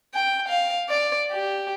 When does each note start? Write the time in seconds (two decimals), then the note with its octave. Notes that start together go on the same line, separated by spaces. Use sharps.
0.14 G5
0.49 F5
0.89 D5
1.32 G4